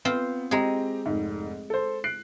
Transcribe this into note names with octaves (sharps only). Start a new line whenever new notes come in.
B3 C4 F4 C5
G#3 C4 G4 G#4 A#5
F1 G#2
A4 C5
F#6 C7 D7